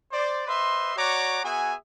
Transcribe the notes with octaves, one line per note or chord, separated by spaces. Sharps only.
C5 D5
B4 C5 D#5 E5 C6
F#4 C#5 D5 F#5 A#5 D6
B3 F#4 G#4 E5 G#5